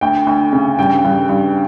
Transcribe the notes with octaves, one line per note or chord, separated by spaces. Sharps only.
D2 G5
D2
C#3
G2 G5
G2
G2